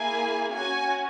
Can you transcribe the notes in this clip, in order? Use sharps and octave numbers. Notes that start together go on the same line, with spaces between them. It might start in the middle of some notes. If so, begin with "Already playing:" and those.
Already playing: A#3 E4 G#4 G#5
C#4 F#4 G#5